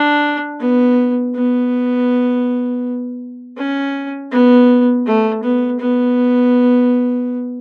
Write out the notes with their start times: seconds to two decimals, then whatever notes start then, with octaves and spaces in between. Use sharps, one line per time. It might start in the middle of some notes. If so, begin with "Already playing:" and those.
Already playing: D4
0.60 B3
1.35 B3
3.57 C#4
4.31 B3
5.06 A3
5.43 B3
5.80 B3